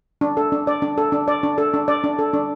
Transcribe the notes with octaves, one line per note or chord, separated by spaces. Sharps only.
D4
A4
D4
D5
D4
A4
D4
D5
D4
A4
D4
D5
D4
A4
D4